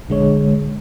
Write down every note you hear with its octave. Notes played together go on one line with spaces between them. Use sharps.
A#1 D3 G#3 C#5